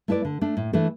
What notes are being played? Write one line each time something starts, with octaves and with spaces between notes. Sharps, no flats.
A3 E4 B4 D5
D3
A3 D4
A2
E3 A3 D4 A4